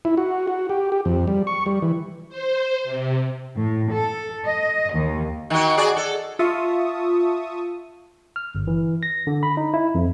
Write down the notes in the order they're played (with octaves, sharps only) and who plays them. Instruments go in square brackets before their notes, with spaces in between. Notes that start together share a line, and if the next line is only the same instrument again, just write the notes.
[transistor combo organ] E4
F#4
F#4
G4
G4
F2
G3
C#6
G3
E3
[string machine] C5
C3
[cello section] A2
A4
D#5
D#2
[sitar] D#3 F#4
F#4 G#4 D5
A4
[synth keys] F4 E5 A5 C#6 D#6
[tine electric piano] F6
G1
E3
A#6
D3
B5
D#4
E4
F2